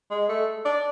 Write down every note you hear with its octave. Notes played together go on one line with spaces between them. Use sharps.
G#3
A3
D4